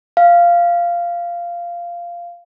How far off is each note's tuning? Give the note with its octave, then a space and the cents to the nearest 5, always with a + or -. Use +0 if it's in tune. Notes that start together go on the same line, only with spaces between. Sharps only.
F5 -10